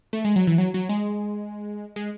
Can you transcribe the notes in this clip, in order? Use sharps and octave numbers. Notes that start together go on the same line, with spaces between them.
A3
G#3
F#3
E3
F#3
F#3
G#3
G#3